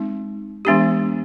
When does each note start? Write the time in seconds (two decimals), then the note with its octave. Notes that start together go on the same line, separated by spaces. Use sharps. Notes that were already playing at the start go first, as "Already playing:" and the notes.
Already playing: G#3 C4 D#4
0.65 E3 G#3 B3 D4 G4